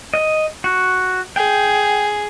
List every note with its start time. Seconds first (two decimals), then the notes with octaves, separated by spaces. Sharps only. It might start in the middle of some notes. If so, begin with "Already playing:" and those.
0.14 D#5
0.64 F#4
1.36 G#4 G5